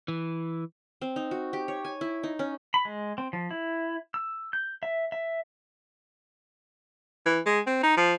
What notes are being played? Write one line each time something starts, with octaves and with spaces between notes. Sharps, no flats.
E3
C4
D#4
F#4
G4
C#5
G#5
E4
D#4
C#4
B5
G#3
C4
F3
E4
E6
G6
E5
E5
E3
G#3
C4
D#4
F3